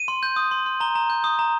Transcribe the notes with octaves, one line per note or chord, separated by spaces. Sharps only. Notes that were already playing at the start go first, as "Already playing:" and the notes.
Already playing: D#7
C6
G6
D#6
C6
C6
A#5 G7
A#5
G6
D#6
A#5